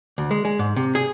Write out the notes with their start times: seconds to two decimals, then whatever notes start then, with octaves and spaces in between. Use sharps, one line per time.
0.18 D2
0.31 G#3
0.45 G#3
0.59 G#2
0.76 C3
0.95 G#4